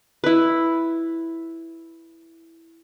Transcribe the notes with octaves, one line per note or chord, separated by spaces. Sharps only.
E4 B4